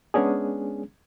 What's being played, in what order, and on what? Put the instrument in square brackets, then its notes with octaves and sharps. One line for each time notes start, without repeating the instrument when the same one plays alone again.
[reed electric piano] G#3 B3 C#4 D4 G#4